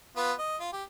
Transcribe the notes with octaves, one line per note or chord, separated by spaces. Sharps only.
B3 F4 B4
D#5
F4
G4